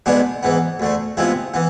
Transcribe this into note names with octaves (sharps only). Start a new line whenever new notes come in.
B1 B2 G#3 B3 D4
G#2 E3 B3
D2 D3 A3
C3 F3 G#3 B3 E4
E3 B3